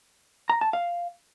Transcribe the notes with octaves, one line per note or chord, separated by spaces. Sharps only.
A#5
A5
F5